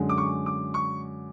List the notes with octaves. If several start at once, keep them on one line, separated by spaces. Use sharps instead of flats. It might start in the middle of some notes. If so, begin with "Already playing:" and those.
Already playing: F#2 D3 G#3
D6
C#6
D6
C#6